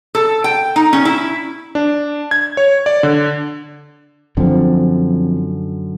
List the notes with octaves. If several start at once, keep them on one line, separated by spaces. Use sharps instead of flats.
A4
G5
D#4
C#4
E4
D4
G#6
C#5
D5
D3
F#2 D3 F3 C4